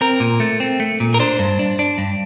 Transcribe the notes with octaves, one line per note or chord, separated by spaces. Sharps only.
C4 A#4
A#2
A3
C4
A3
A#2
A#4
D4 C5
G2
D4
D4
G2